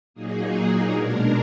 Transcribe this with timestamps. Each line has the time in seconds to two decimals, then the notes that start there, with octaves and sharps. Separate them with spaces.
0.14 A#2 F#3 A#3 D#4 G#4
0.88 B2 G#3 D4 A#4